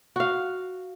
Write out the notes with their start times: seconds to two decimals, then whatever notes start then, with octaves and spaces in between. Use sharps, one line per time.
0.16 F#4 F5